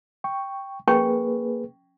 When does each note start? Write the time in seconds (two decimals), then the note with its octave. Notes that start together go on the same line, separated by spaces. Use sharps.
0.24 G5 C#6
0.88 A#3 C#4 G#4 B4 G5 C#6